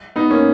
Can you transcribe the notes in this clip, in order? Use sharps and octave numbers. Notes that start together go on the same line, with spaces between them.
B3 D#4
A#3 C#4